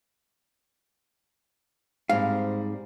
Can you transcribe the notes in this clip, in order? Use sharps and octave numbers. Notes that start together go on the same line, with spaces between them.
G#2 G3 C4 F5